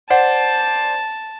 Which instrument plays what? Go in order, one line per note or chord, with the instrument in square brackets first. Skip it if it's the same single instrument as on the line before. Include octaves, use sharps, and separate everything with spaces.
[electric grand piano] C5 D5 [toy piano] F#5 [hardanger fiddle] A5